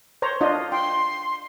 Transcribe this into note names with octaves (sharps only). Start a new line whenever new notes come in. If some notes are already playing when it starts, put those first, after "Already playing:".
C5 C#5 A#5
D4 F4 D#5
G5 C6